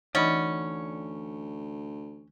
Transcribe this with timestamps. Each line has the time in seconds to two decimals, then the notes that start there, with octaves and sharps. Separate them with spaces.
0.15 D2 E3 C#4 D#4 D5 D#5 F#5 B5